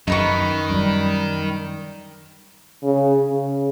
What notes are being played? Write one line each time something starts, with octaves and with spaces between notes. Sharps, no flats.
F#2 D#3 D#4 B4 C#6
F#2 G3
C#3
C#3